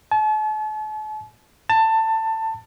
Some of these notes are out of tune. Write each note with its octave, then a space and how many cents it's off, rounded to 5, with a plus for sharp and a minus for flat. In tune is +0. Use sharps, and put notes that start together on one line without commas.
A5 -40
A5 +20